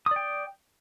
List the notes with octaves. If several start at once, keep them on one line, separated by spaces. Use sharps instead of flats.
D5 G5 D#6